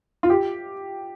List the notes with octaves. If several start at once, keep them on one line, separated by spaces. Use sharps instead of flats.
F4
G4